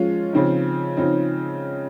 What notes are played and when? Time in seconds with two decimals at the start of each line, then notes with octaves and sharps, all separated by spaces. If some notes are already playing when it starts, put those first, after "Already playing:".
Already playing: F3 G#3 C#4 F4
0.33 C#3 F3 C4 D#4
0.97 C#3 F3 C4 D#4